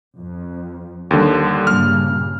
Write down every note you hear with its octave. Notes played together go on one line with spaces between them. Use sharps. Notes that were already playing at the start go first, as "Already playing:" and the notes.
F2
D#2 D3 G3
G2 A#2 C#3 F6